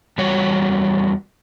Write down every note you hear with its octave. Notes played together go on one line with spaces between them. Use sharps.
E2 G3 F#4 C#5